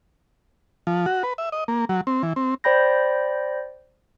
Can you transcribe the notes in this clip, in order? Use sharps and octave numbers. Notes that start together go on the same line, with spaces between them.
F3
F#4
B4
E5
D#5
A#3
F#3
C4
E3
C4
C5 D5 G5 B5 G6 A#6